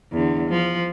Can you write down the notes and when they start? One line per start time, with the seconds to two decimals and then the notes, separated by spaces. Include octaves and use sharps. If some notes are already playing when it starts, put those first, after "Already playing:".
0.12 E2 D3
0.50 F3